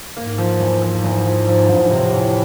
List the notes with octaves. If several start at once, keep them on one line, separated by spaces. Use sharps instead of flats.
G#2 A#3
F3
E2
F3
E2
F3
F3
E2 G2
G#2
A2 C3
E3